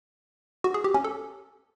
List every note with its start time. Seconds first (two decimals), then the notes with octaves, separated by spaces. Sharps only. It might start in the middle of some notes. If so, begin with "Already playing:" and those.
0.64 F#4
0.74 G#4
0.84 G4
0.94 C#4
1.04 A4